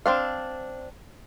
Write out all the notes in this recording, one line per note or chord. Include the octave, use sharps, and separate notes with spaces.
C4 D4 F5